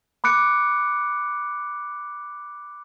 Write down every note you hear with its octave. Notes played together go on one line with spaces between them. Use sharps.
B5 D6 F#6 C#7 D7